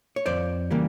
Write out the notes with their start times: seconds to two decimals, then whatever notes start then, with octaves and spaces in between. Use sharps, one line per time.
0.16 C#5
0.26 F2 C5 D5
0.71 C#3 E3 G3 A#3